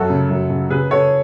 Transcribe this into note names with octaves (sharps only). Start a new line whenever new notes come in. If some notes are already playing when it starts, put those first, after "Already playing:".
Already playing: F#2 F#4 A4
C#3
F#2
C#3
C#3 G#4 B4
C#3 A4 C#5